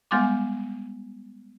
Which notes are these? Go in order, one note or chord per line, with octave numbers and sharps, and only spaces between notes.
G3 G#3 B3 G#5 C6 D6